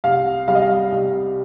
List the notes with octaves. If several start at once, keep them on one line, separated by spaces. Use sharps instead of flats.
C2 F5
G3 F5
D#5
F5
C2